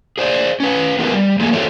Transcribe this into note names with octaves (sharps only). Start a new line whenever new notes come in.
G#4 C5 D5
C#4 B4
B3 F4 G#4 A#4 B4
G3
F3 A3 A#3 G#4
F4 F#4 A4 C5 C#5